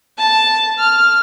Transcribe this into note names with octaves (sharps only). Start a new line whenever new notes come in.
A5
F6